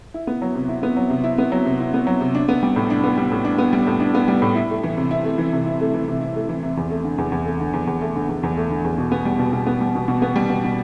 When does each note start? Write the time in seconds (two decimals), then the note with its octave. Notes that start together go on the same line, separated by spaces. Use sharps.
0.14 E4
0.27 B3
0.42 F#3
0.55 C3
0.69 E4
0.83 B3
0.97 F#3
1.10 C3
1.24 E4
1.38 B3
1.52 F#3
1.66 C3
1.80 E4
1.94 B3
2.07 F#3
2.21 C3
2.35 D4
2.48 B3
2.63 G3
2.76 A2
2.90 D4
3.04 B3
3.18 G3
3.32 A2
3.45 D4
3.58 B3
3.73 G3
3.87 A2
4.00 D4
4.15 B3
4.28 G3
4.42 A2
4.55 E4
4.70 A3
4.83 E3
4.97 C3
5.11 E4
5.24 A3
5.38 E3
5.53 C3
5.66 E4
5.81 A3
5.94 E3
6.08 C3
6.21 E4
6.36 A3
6.49 E3
6.63 C3
6.77 E2
6.91 A3
7.04 D3
7.18 E2
7.32 E2
7.45 A3
7.60 D3
7.73 E2
7.87 E2
8.01 A3
8.15 D3
8.29 E2
8.43 E2
8.57 A3
8.70 D3
8.84 E2
8.98 B2
9.12 B3
9.25 G3
9.39 B2
9.53 B2
9.66 B3
9.81 G3
9.95 B2
10.08 B2
10.22 B3
10.36 G3
10.50 B2
10.64 B2